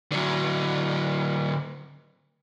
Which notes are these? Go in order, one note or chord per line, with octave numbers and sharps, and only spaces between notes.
D3 F#3